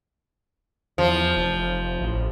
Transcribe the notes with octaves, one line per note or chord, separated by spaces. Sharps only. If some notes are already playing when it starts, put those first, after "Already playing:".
E2 F3
F1
A1